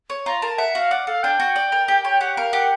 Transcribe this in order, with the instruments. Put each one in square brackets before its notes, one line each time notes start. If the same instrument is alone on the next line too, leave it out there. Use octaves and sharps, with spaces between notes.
[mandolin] C#5
[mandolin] F4 [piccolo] A#5
[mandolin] A#4 [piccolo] A5
[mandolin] E5 [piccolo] F#5
[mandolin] F#4 [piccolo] F5
[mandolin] D5 [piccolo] F#5
[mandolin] A4 [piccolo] F5
[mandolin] D4 [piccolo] G5
[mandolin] F#4
D5
A#4
G4
C#5
[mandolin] G4 [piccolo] F#5
[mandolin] A#4 [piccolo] F5
[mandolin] G4 [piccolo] F#5